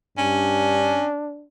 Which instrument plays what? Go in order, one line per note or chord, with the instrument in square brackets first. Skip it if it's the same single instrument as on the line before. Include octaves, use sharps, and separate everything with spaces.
[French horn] G2 [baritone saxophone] C#4 [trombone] D4